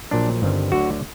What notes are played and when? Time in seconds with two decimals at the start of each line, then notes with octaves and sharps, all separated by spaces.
0.11 A#1 A#2 F#3 D4
0.42 G1 G2 D#3 G3 C4
0.71 D2 D3 F#3 F#4